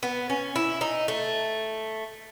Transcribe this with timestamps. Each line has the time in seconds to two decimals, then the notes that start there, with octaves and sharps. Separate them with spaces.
0.03 B3
0.30 C#4
0.56 E4
0.81 D#4
1.08 A3